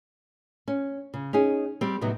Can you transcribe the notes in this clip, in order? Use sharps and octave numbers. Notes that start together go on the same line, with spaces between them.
C#4
C#3
C#4 D#4 G#4
G3 C4
A2 C3 F#3 B3 D#4